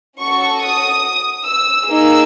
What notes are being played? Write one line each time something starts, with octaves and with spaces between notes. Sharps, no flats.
C#4 F#4 A4 C#6
D#6
E6
A#3 D#4 G#4 E6